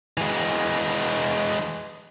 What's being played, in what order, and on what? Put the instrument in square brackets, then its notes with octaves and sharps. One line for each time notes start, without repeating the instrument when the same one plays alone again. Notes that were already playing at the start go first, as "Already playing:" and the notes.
[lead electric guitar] E3 G#3